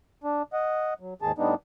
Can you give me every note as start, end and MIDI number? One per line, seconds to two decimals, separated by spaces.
0.24 0.42 62
0.53 0.94 75
0.53 0.94 78
1.00 1.14 54
1.22 1.32 39
1.22 1.32 44
1.22 1.32 51
1.22 1.32 68
1.22 1.32 81
1.38 1.55 45
1.38 1.55 55
1.38 1.55 59
1.38 1.55 62
1.38 1.55 63